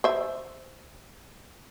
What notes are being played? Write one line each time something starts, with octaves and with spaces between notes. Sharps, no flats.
C5 E5